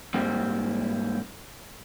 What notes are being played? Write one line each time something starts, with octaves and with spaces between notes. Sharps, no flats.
G#2 G3 A#3 C4